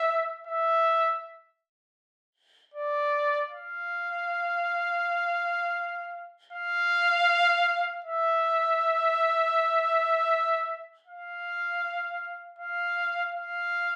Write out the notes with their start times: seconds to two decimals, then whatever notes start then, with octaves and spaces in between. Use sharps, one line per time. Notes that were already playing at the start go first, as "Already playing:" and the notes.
Already playing: E5
0.47 E5
2.74 D5
3.50 F5
6.53 F5
8.04 E5
11.07 F5
12.59 F5
13.35 F5